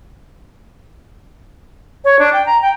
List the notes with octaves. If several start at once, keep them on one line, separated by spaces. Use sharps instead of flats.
C#5
D4
G5
A#5
G5